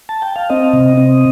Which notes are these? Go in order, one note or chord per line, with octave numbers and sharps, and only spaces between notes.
A5
G5
F5
C4 D#5
C3
C4